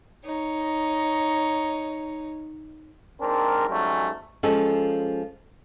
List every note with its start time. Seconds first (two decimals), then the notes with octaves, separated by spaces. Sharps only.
0.25 D#4 C#5
3.21 G#2 C4 D4 A#4
3.69 G#2 F#3 G3 A3 C#4
4.43 F3 G#3 C#4 A4